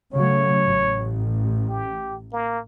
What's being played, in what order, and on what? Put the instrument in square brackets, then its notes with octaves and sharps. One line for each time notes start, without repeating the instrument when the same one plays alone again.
[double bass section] C#3 F#3 A3 [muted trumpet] C#5
[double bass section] A1
[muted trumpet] G4
A#3